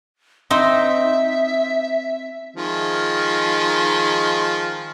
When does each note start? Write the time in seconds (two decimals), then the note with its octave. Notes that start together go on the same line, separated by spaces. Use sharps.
0.50 C4 D#4 E5
2.56 D#3 F3 G#3